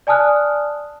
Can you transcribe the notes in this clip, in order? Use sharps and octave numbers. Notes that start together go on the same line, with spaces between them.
D5 G#5 A5 D#6 F6 F#6